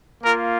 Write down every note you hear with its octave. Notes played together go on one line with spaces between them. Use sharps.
A#3 F4 A#4